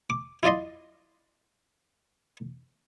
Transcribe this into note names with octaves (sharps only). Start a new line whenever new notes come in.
D6
E4 F4 D5 D#5 C6